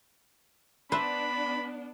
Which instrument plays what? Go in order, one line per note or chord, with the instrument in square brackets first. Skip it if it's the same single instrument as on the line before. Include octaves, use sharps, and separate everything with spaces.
[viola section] B3 D4 [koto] B4 C5 E5 [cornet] B5